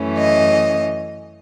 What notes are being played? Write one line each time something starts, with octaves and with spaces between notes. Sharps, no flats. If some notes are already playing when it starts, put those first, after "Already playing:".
Already playing: F#2 E3 A3 C#4
D#5